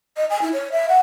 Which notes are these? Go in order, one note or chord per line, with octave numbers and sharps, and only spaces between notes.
D#5
G#5
E4
C#5
E5
F#5